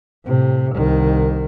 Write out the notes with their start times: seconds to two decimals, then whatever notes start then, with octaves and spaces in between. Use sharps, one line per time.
0.25 A2 C3
0.73 C2 D#3